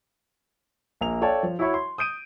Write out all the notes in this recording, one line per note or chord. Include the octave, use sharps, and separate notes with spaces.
A#1 A#3 F7
A4 C#5 D5 F5 G5 A5
F3
E4 F#4 C#5 E5 B5 C#6
C6
D#6 G6 D7 D#7